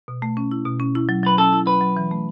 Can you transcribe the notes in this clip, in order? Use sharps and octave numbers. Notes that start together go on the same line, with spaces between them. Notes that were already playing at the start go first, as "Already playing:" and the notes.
B2
A3
C#4
E4
B2
C#4
E4
F#3
F#3 B4
C#4 A4
E4
F#3 B4
F#3
E3
A3